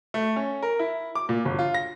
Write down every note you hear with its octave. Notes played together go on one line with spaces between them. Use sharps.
A3
C#4
A#4
E4
D6
A#2
G1
F4
A#6